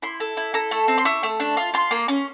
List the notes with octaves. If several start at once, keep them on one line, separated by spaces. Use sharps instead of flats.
E4 C6
A4
E4
A4 A#5
A3
C4
C6
E4 C#6
A3
D4
F4
F4 C6
A#3
C#4